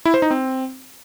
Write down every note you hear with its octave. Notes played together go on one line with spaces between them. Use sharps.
E4
C5
D#4
C4